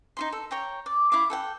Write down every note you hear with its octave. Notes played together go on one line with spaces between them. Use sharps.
D#4 F4 C6
A4
C#5 G5 A#5
D5
E4 F5 D6
A4 F#5 G5